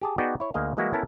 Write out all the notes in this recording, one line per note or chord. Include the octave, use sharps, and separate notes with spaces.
G4 G#4 A5
B3 D#4 F#4 G#4 D5 G5
E4 C#5
D2 A#3 G#4 D#5 F5
E3 G3 G#3 A#3 E4 F#4
B3 C#4 E4 A4 A#4 A5